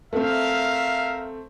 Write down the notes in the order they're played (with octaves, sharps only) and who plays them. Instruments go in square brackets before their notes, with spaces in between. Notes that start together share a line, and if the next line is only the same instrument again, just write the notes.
[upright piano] A3 C4 [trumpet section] A#4 E5 F5